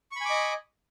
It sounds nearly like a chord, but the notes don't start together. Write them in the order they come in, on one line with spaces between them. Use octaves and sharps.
C#6 B5 G#5 D6 D#5